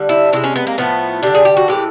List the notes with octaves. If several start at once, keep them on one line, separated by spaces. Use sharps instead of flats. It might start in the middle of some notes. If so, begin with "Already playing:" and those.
Already playing: D3 G3
E4
C3 D#3 G#3 E4
C#4
B3
A#3
A2 F3 A3 B3
D3 G3 D4
G#4
G4
F#4
A2 E3 G#3 G4